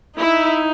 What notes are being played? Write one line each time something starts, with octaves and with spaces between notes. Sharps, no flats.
D#4 E4